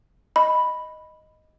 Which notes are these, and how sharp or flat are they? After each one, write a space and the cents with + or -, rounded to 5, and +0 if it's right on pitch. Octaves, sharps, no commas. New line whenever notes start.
D#5 +0 B5 +0